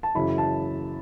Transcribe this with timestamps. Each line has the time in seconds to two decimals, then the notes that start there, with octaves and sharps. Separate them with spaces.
0.03 A5
0.15 F#2 C#3 E3 B5
0.38 A5